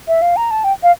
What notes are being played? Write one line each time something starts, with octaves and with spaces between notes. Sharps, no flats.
E5
F5
A#5
A5
G5
F5